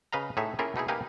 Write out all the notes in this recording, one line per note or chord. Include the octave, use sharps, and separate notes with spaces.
C#3 B4 D#5 F5 A#5
A2 D#4 G#4 C#5 E5
A#3 C#4 E4 F4 G#4 A#4
B2 D#4 E4 G#4
A#3 D#4 G4 B4 F5 G#5